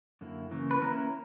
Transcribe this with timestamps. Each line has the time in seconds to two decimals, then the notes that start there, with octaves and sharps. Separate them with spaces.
0.21 F#2 D3 A#3 E4
0.51 C#3 E3 A#3
0.71 B4
0.82 A#3 C#4 E4 A#4